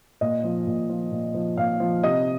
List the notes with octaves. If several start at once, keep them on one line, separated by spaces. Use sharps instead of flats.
A#2 D#5
F3
A#2
F3
A#2
F3
A#2 F5
F3
C3 D#5